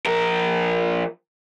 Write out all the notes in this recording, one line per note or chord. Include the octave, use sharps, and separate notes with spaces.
F3 A#4